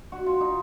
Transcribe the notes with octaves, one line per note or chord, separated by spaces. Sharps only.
F#4
F4
D#4